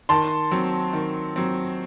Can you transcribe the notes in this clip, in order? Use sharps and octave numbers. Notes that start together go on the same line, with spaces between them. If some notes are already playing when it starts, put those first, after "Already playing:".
D#3 A5 C6
F#3 C4
D#3
F#3 C4